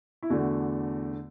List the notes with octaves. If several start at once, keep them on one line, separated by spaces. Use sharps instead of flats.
E4
E2 D3 A3 F#4